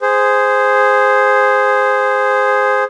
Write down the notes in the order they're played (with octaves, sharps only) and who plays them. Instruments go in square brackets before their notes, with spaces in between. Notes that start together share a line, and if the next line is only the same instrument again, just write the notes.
[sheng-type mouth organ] G#4 C5